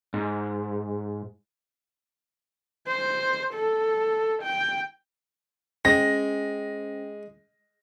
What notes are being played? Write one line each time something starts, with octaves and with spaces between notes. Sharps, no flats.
G#2
C5
A4
G5
G#3 C#4 C5 G5 A#6